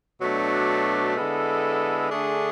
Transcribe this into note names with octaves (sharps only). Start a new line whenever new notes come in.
B2 F#3 A3 D4
D3 G#3 B3 E4 A4
D3 A3 D4 G#4